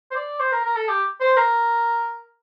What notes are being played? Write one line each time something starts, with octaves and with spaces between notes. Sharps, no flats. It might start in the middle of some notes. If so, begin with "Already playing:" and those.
C5
D5
C5
A#4
A#4
A4
G4
C5
A#4